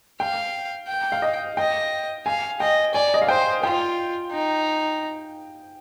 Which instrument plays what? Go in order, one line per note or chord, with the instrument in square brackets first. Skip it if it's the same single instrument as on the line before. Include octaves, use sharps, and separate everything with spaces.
[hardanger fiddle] F5 [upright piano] G5
[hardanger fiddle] G5
[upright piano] F5
D#5
[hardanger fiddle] D#5 [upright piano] G5
[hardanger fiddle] F5 [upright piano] G#5
[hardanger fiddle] D#5 [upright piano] G5
[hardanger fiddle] D5 [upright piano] G#5
[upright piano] D#5
F5
[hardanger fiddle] C5 [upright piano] G5
[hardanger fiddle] F4 [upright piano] G5
[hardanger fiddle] D#4